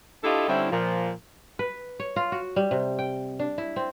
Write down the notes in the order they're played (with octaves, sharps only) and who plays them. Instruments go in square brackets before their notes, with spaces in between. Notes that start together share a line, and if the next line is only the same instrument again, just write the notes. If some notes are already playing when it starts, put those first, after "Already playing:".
[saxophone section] D4 E4 F4 G4 A4 D#5
D3 G3 C4 C#4 E4
A#2 F3
[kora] B4
C#5
F4
F#4
G3
C3
G5
D4
E4
C4